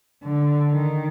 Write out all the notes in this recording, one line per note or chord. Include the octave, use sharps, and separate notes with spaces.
D3
D#3